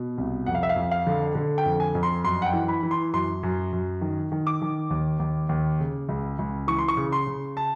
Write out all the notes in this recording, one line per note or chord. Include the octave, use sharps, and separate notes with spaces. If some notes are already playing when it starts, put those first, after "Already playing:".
Already playing: B2
C2
F2 F#5
F5
E5
F5
F2
F5
D3
D3
G5
F2
G#5
F2
C6
F#2 C6
F#5
G5
E3
B5
E3
C6
F#2 C6
F#2
F#2
D#3
D#3
D6
D#3
D#2
D#2
D#2
C#3
C#2
C#2
E3 C#6
C6
C#6
C#3
C6
C#3
A5